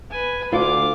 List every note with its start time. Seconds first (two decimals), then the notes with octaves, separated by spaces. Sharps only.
0.11 B4 G#5
0.52 D2 F4 F5 D6